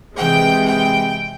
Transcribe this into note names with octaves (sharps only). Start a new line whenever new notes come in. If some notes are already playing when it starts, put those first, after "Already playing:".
C3 E3 G#3 G5
G5